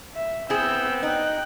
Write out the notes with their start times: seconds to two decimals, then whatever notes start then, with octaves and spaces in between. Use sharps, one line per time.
0.15 E5
0.50 B3 C4 E4 G#4 E6 G6
1.03 D#4 G5 F#6